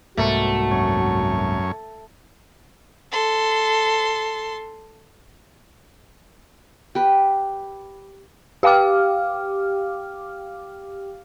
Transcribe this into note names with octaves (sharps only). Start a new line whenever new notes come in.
C2 G#2 A3 A#3 F#4
F#2 C#5
A4 C6
G4 B4
G4 F5 G5 D6 F6